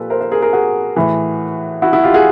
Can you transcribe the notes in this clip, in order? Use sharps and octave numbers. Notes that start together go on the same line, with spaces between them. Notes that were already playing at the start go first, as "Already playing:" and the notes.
Already playing: A#2 F3 G4 A4 B4
A#4 C5
A#4 C5
G#4 A#4
G#4 A#4
F#4 G#4
A2 E3
E4 F#4
E4 F#4
F4 G4
F#4 G#4